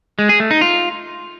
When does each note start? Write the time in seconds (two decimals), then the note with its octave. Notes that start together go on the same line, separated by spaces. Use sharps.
0.19 G#3
0.29 G#4
0.40 A3
0.51 D#4
0.61 F4